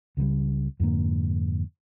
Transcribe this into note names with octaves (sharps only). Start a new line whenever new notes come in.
C#2 C#3 F#3 G3
F2 G#2 D3 A#3